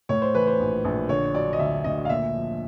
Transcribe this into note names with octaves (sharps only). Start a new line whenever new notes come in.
A2 C#5
C5
E3 B4
C5
A#1
A#1
D3 C#5
F#3 D5
D#5
D2 E5
D2 D#5
F5
A#2 E5
F3